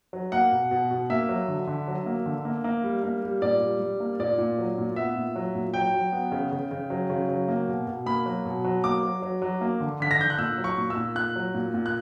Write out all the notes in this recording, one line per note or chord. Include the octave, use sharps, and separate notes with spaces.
F#3
A#3 F#5
B2
B2
B2
A#3 E5
F#3
D3
D3
F#3
A#3
D3
A#3
A#3
G3
A#3
G3
A#2 D5
G3
G3
A#3
A#2 D5
A#2
F#3
A#2
B3 E5
A#2
F#3
A#2
F#3 G5
F#3
B3
C#3
C#3
C#3
F#3
C#3
F#3
A#3
B2
B2
A#3 B5
F#3
B2
F#3
A#3 D6
F#3
F#3
F#3
A#3
D3
D3 B6
A#6
D3 G6
F#6
A#2 E6
F#3
C#6
A#2
E6
A#2
A#2 F#6
F#3
A#2
A#2
F#6